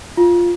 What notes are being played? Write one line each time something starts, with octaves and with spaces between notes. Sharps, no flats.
F4